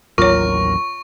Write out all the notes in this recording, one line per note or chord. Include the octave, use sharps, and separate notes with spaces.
A1 D#2 F#3 F4 A#4 C#5 C#6